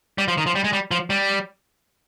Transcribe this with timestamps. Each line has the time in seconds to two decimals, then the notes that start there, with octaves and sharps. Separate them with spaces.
0.18 G3
0.28 F3
0.38 D#3
0.46 F3
0.55 G3
0.64 G#3
0.73 G3
0.91 F3
1.10 G3